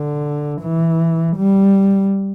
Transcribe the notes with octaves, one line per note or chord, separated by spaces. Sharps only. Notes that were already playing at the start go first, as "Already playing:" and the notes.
Already playing: D3
E3
G3